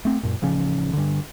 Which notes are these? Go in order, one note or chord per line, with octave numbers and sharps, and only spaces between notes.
A3 C4
F#2 A#2
A1 C#3 F3 C#4
G2 D3